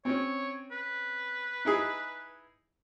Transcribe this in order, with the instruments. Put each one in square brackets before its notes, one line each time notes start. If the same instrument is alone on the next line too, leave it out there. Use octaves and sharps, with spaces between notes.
[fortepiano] C4 C#4 [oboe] C#5
[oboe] B4
[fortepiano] D#4 E4 G#4